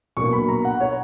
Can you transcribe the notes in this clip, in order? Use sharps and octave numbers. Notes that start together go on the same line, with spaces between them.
B2 F#3 A#3 D4 C#6
B5
A#5
F#5
C#5